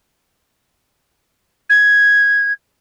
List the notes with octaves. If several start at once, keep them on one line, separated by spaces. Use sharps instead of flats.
G#6